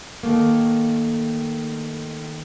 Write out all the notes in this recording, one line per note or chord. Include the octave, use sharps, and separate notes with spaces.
D#3 A3 A#3